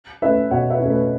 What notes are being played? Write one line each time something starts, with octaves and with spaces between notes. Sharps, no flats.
A3 C#4 E4 B4 E5
B2 C#5 F#5
B4 E5
A3 C#4 E4
B4